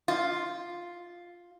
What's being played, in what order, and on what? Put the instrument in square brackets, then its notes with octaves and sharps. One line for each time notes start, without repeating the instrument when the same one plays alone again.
[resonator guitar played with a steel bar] F4